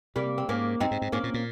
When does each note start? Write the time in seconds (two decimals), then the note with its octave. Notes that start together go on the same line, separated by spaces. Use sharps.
0.16 C3 G3 A#3
0.38 C4
0.49 G#2 A#3 C#4
0.80 G2 C4 D#4
0.91 G#2
1.02 G#2
1.12 G#2 A#3 C#4
1.23 A#2
1.34 A#2